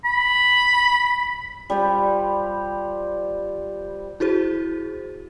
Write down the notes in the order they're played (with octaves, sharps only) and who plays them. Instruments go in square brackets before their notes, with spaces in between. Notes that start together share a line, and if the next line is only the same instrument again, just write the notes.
[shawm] B5
[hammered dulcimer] G3 F4 C5
[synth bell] E4 F#4 G#4 C5